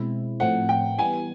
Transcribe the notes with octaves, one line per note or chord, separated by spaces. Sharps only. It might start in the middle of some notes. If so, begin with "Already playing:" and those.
Already playing: B2 G#3 C4 E4
A2 F3 A3 C4 F#5
G5
E3 G3 B3 G#5